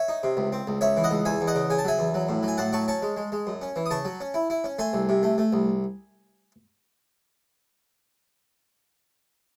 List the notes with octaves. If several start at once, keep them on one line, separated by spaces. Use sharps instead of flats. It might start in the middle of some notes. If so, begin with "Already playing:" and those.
Already playing: C#5 E5
D#4
C3
C#2
C4
C#2
C#2 C#5 E5
E3
D#5 F#5
C#2
E2 E5 G#5
E2
D#5 F#5
C#3
C#3 G#5
A5
F#3 E5 G#5
E2
F#3
A2
F#3
G#5
A2 F#5 A5
F#3 A5 C#6
C#4 A5 C#6
G#3
G#3
G#3
F#2
C#4
E3
D#6
C#3 A5 C#6
F#3
C#4
E4
E4
C#4
A3 G#5 C6
C2
C3
A3
A3
C2